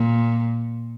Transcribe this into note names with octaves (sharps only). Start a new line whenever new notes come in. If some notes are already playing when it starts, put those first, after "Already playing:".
Already playing: A#2